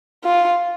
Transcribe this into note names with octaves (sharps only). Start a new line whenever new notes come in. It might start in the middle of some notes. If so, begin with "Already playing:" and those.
F4